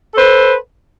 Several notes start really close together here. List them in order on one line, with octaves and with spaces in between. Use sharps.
A4 B4 C5